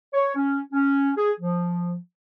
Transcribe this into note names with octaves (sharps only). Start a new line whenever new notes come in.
C#5
C#4
C#4
G#4
F3